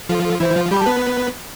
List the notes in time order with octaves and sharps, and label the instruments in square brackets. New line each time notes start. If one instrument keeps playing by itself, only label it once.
[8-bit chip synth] F3 F4 [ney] A4
[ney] A4
[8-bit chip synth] E3 E4 [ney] C5
[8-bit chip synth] F3 F4
[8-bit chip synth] G3 G4 [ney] B5
[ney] A5
[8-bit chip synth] B3 B4